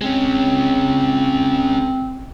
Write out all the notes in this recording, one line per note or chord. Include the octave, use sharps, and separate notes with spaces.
G#3 C4 C#4